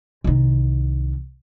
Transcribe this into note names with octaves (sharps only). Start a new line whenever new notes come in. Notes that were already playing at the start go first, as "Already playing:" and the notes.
C2 D#3